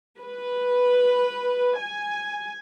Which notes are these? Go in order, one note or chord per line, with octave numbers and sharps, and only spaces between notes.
B4
G#5